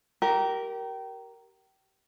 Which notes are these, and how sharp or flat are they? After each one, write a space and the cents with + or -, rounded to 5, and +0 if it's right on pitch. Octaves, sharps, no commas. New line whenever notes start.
G4 -25 A#4 +0